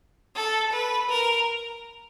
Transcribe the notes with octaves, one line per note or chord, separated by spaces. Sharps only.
A4
B4
A#4